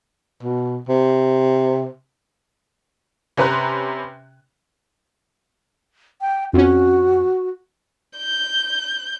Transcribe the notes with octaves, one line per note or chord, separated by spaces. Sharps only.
B2
C3
C3 C#4 B4 A#5 C6 F#6
G5
F2 C#4 F#4
G6